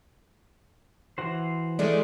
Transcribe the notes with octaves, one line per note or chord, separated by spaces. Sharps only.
E3 F#4 C5
D#3 G#3 A3 D4